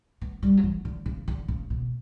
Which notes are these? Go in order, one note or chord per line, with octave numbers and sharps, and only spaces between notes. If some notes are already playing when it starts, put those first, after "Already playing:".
B3
G3
F#3
E3
D3
C#3
D3
C#3
B2